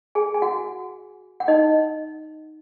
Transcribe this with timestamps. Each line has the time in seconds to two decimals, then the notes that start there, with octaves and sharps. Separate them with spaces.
0.15 G#4 G#5
0.34 G#5
0.42 F#4 F#5
1.40 F#5
1.48 D#4 D#5